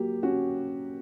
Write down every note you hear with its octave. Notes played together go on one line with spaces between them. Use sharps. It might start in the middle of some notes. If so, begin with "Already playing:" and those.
Already playing: F#3 A#3 G4
C#4 F#4